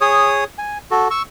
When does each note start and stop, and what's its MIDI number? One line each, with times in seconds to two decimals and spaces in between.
0.01 0.44 68
0.01 0.44 73
0.01 0.44 87
0.58 0.78 80
0.91 1.08 66
0.91 1.08 69
1.11 1.22 85
1.11 1.22 88